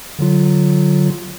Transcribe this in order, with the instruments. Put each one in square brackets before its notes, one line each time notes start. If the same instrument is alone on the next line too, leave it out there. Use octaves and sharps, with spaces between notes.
[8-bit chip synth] D3 F#3 F4